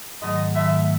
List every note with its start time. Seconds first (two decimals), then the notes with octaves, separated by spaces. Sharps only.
0.22 G#2 D#3 F#3 A3 D#5
0.55 G#2 D#3 F#3 A3 E5